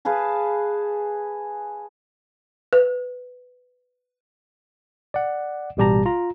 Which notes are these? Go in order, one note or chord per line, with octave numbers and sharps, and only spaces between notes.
G#4 B4 F5 A5
B4
D5 F#5
A1 B2 G3 G4 A5 A#5
F4 A#5